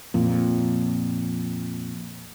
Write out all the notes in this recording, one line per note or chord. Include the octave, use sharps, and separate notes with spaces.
F2 A#2